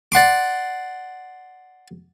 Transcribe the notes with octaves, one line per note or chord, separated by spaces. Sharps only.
D5 F#5 C6 D6